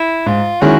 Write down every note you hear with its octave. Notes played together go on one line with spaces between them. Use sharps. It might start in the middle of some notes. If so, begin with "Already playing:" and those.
Already playing: E4
G#2 F4
D#3 G#3 C#4 E4 F#4